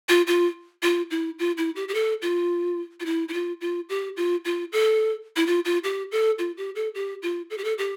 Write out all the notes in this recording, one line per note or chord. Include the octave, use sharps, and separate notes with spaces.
F4
F4
F4
E4
F4
E4
G4
G4
A4
F4
F4
E4
E4
F4
F4
G4
F4
F4
A4
E4
F4
F4
G4
A4
F4
G4
A4
G4
F4
A4
G4
A4
G4